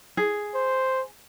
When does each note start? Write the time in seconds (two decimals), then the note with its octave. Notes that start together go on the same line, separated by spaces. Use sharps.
0.17 G#4
0.55 C5